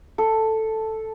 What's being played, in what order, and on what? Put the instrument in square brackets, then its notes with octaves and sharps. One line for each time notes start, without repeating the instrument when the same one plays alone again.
[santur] A4